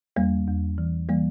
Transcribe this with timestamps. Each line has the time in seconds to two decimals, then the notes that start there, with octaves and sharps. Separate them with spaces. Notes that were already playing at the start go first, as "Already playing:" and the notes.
0.16 E2 G3 A#3
0.47 E2
0.78 E3
1.09 E3 G3 A#3